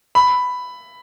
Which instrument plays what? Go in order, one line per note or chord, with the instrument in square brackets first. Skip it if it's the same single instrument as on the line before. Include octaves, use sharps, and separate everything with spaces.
[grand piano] B5